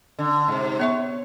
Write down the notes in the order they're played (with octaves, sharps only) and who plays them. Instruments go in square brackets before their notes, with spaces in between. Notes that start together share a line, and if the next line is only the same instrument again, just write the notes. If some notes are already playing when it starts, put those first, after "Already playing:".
[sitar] D3
G#2 C3
[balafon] B3 E5 C#6 [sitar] C#5